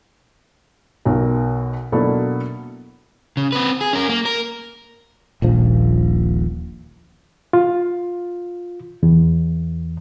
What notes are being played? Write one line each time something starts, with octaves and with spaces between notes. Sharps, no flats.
B1 B2 A#4
B2 F#3 A#3 D4 E4 A4
C#3
C4 B4
G#4
C#4 A#4
A#3
A#4
D#1 A#1 F3
F4
E2